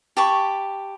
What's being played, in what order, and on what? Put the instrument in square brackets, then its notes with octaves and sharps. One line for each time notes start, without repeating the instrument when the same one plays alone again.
[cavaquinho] G4 A5 B5 C#6